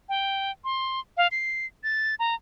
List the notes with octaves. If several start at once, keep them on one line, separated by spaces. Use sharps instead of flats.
G5
C6
F5
C7
A6
A#5